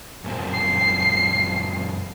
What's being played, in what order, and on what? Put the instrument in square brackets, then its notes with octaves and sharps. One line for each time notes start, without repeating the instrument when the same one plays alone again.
[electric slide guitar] F#2 A#2 C4
[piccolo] C7